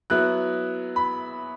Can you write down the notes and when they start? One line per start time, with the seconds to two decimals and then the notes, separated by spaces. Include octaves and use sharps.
0.10 F#3 B3 E4 F#6
0.96 B5